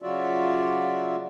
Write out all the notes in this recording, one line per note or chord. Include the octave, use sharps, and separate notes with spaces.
C#3 F#3 F4 F#4 D5 E5